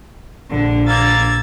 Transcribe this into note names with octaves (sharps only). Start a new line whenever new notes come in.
A#1 D3
A#3 E6 G#6 A6